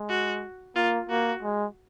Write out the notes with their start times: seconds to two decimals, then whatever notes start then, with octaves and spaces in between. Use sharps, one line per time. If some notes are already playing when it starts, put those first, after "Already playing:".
Already playing: G#3
0.09 F#4
0.76 A#3 F4
1.09 A#3 F#4
1.43 G#3